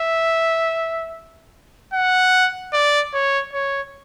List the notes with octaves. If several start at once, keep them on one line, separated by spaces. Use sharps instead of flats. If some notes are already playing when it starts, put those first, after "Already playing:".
Already playing: E5
F#5
D5
C#5
C#5